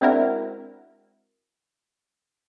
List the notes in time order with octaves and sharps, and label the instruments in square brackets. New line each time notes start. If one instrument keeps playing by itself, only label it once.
[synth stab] G#3 C4 D4 E4 F#4 A#4